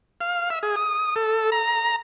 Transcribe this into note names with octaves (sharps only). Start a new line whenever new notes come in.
F5
E5
G#4
D#6
A4
A#5